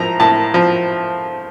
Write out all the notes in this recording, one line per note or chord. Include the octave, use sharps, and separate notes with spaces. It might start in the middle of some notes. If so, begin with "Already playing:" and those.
Already playing: A2 F3 A#5
A2 A5
F3